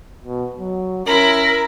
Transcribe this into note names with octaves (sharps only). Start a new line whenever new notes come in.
B2
F#3
C#4 E4 A#4 B5